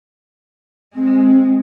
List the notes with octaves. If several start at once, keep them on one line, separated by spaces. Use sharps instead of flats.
G#3 C4